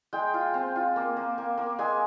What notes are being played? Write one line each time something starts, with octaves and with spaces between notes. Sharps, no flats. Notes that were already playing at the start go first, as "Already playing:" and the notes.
G#3 G5
F4
C4
F4
A#3
A#3
A#3
A#3
G#3 G#5